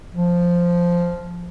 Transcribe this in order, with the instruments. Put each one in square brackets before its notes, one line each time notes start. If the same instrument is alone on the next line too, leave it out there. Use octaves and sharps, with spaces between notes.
[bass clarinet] F3